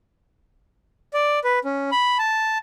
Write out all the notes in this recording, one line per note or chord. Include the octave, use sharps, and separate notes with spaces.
D5
B4
C#4
B5
A5